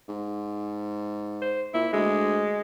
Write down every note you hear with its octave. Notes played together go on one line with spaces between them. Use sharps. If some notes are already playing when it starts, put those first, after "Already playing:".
G#2
C5
A#2 E4
D2 G#3